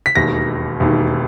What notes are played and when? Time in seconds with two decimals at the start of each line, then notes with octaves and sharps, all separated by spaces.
0.06 B6
0.15 E1 D#2 D#3 A#6
0.80 E1 D#2 D#3